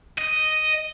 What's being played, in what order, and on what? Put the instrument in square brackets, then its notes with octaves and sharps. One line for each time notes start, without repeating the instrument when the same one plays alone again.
[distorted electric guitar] D#5